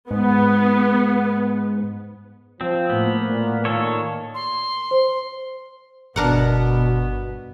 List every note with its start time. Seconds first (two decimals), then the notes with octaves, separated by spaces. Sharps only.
0.11 G#2 B3
2.61 F3 C4
2.90 A2 A#3 B3
3.29 A#2
3.65 A#2 D#3 A4 C#5
4.34 C6
4.91 C5
6.16 G1 B2 B3 D4 A#4 F#5